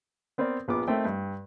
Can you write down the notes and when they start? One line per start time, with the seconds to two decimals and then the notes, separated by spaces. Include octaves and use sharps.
0.38 B3 C4 A#4 B4 D5
0.68 A#1 B3 F4 D6
0.88 A3 C4 D#4 A#4 E5 G5
1.05 G2